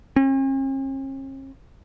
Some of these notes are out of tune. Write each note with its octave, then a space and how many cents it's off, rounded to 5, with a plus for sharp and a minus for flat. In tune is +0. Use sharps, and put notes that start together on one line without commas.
C#4 -45